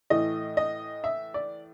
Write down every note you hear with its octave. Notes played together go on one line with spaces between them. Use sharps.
A2 E3 A3 D#5
D#5
E5
D5